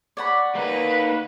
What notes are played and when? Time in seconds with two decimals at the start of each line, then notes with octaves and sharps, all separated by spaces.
0.17 C#5 D5 F#5 B5
0.56 A#3 D#4 B4